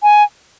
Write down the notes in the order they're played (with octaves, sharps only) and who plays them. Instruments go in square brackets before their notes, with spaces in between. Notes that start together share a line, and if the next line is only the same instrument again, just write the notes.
[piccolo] G#5